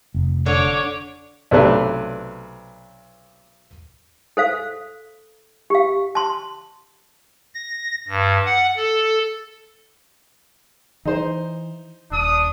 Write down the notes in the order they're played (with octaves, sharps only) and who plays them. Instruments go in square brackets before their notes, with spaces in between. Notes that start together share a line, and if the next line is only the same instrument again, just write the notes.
[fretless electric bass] F1
[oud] D3 [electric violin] C#5 D6
[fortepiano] B1 C3 A3 D4 B4
[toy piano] A4 C5 F5
G4 F5
A5 C6
[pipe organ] A#6
G2
F#5
A4
[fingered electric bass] E3 [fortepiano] D#4 C5
[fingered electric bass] D#1 [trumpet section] D4 D#6